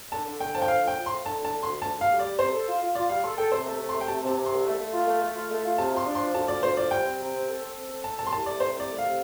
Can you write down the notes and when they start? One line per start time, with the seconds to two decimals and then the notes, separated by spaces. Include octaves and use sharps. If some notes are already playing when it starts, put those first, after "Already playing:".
0.12 D3 A5
0.26 D3
0.40 D3 G5
0.54 F3 A5
0.62 G5
0.68 D3 F5
0.83 F3 G5
0.97 F3
1.06 A3 C6
1.26 D3 A5
1.39 D2
1.44 A5
1.54 D3
1.63 D2 C6
1.82 D2 A5
1.97 D2 F5
2.10 G3
2.19 D5
2.25 G3
2.39 C3 C5
2.52 A4
2.67 F4
2.81 F4
2.95 F4 D5
3.09 G3 F5
3.24 A4 C6
3.37 A4 G5
3.51 C3 C5
3.66 A3
3.80 C3
3.89 C6
3.95 A3
4.01 G5
4.08 C3 A5
4.22 C3
4.27 A5
4.37 C3
4.46 C2 C6
4.65 A3
4.78 A3
4.93 F4
5.07 A3
5.21 A3
5.36 F4
5.50 A3
5.64 F4
5.78 C3 A5
5.92 F3 C6
6.06 D4
6.15 C6
6.21 F3
6.34 D2 A5
6.48 F3 D5
6.63 D2 C5
6.77 F3 D5
6.91 G3 G5
7.05 C4
7.19 C3
7.34 C4
7.48 A4
7.62 C4
7.76 C4
7.90 A4
8.04 A3 A5
8.19 C2 A5
8.27 C6
8.32 C2 A5
8.46 A3 D5
8.60 C3 C5
8.75 C2 D5
8.90 A3
8.98 C3 F5